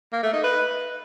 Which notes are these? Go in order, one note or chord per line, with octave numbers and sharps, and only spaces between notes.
A#3
A3
D#4
B4